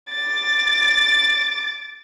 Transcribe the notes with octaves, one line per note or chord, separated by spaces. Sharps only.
D6 A6